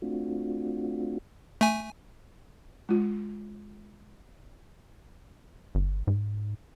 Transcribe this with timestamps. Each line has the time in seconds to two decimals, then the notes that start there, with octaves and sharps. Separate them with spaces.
0.02 A3 C4 D4 F4 F#4
1.61 A3 G#5
2.89 G#3 F4
5.75 G1
6.07 G#2